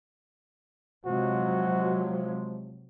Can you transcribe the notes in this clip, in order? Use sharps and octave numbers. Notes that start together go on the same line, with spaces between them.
C3 F3 F#3 G#3 F#4